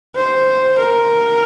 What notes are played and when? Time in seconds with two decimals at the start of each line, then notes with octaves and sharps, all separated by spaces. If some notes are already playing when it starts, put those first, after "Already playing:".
0.16 C5
0.79 A#4